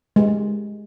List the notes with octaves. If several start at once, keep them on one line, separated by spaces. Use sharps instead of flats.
G#3 G4